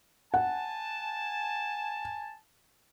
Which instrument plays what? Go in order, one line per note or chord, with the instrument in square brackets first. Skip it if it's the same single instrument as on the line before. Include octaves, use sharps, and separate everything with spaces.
[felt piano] F#5 [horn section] G#5 A5